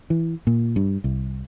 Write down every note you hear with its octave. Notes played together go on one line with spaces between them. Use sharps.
E3
A#2
G2
C2